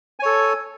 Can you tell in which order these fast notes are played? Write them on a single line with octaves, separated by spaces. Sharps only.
G#5 C#5 A4